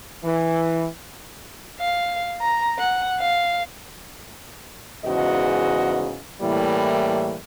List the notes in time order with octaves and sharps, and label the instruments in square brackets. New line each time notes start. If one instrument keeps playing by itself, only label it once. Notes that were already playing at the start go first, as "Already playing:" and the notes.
[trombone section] E3
[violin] F5
A#5
F#5
F5
[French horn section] E2 G#2 C#3 F#4 D#5
A2 E3 G3 A#3